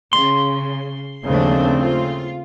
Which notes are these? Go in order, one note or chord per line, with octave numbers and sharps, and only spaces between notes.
C#3 C6
D#2 C#3 F3 A3 C4 D4
F4